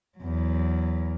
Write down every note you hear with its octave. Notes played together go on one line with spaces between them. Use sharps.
E2 F#3